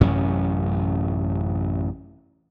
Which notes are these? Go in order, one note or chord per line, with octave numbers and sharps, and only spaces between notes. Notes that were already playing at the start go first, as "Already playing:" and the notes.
A1 F#2 C3 C#4